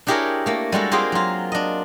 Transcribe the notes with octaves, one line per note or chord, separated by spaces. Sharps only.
D4 E4 G4 G#4 A#4 C#5
A3 A#3
G3 G#3 F#4 A4
A#3 C4 F4 G4 G#4
F#3 F4
D4 D#5